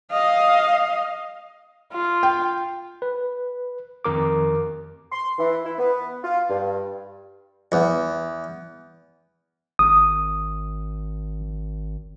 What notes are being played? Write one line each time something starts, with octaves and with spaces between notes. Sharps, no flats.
D#5 F5
F4
G5
B4
F2 D#3 A#4 D6
C6
E3
E4
B3
F4
G2
E2
G#1 D#6